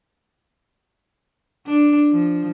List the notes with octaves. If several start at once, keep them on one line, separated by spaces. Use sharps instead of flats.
D4
F3